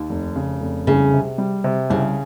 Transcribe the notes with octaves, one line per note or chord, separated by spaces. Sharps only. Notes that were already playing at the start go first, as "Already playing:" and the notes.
Already playing: D#2
F1
C#3
F1
C2 C#3
C3
G3
C3
C2 C#3